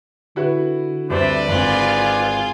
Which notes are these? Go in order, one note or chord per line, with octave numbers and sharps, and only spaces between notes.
D3 E4 F#4 B4
D2 G3 C4 B4 C5 D5 E5
G#1 F4 G#4